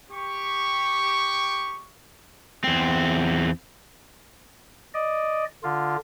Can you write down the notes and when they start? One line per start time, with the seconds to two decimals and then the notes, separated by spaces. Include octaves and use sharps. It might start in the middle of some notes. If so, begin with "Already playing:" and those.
0.12 G4 C#6
2.64 E2 C4
4.94 D5 D#5
5.64 D3 F4